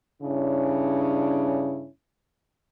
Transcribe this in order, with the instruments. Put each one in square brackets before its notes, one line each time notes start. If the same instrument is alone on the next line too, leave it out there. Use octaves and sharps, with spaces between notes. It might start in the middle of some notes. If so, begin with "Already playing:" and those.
[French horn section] G2 C#3 C#4 D4 E4